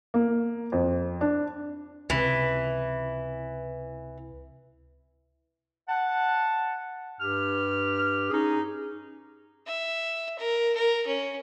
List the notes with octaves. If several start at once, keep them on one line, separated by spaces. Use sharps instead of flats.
A#3
F2
D4
C#2 C3 E3
F#5 A5
G2 G4 F6
C#4 D#4 G#4
E5
A#4
A#4
C#4